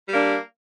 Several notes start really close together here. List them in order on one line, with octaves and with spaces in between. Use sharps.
G3 A#3 D4